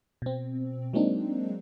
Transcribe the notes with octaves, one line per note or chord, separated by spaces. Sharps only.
B2 C4
F#3 G#3 A#3 C4 D4 D#4